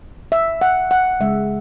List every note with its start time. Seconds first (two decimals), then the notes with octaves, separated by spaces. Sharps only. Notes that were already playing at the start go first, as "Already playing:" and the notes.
0.32 E5
0.61 F#5
0.91 F#5
1.20 C#3 G#3 E5